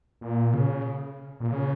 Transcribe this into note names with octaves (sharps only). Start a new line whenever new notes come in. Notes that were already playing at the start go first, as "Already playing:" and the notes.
A#2
C#3
A#2
C#3